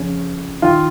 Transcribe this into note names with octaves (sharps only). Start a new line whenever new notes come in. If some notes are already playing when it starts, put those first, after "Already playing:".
Already playing: F2 C#3 C#4
D#3 F4